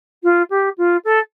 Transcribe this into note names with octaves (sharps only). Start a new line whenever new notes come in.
F4
G4
F4
A4